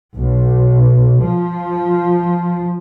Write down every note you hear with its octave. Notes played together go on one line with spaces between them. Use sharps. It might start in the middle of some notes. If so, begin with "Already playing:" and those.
B1
F3